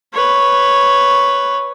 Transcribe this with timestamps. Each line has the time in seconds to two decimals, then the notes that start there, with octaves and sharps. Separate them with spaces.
0.13 B4 C#5